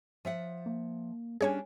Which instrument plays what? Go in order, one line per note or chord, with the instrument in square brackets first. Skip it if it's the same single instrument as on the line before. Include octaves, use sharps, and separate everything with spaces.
[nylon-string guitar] F3 E5 F#5
[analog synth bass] A#3
[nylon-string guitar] G3 C#4 D4 [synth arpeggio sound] G#4 C#5 G#5